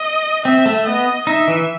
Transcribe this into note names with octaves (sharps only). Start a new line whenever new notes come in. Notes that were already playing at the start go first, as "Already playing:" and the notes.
Already playing: D#5
C4 E5
A3
B3 D#5
D#4 E5
E3